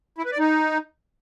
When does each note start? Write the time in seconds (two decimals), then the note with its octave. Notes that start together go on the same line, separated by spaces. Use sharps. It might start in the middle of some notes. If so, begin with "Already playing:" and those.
0.18 E4
0.25 B4
0.32 D5
0.38 D#4